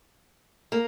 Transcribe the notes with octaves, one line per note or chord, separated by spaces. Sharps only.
A#3